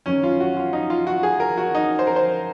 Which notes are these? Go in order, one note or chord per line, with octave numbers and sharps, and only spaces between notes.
F#2 D#3 C#4
F4
F#4
F4
D#4
F4
F#4
G#4
A#4
F#4
D#4
C5
A#4
C5